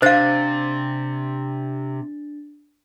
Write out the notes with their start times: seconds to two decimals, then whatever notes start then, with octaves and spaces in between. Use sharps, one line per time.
0.02 C3 D4 C5 F5 A6